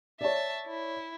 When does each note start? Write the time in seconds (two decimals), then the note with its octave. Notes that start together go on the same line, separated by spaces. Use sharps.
0.21 C#5 D5 E5 A5
0.66 E4